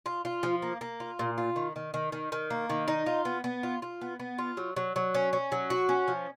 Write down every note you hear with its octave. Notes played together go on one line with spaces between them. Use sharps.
F4
F4
F3
A#3
A#3
F4
A#2
F4
D#3
D#3
D#3
D#3
D#3
A#3
D#3
D#4
F4
B3
B3
F4
F4
B3
B3
F4
F#3
F#3
F#3
C#4
C#4
F#3
F#4
C#4
F3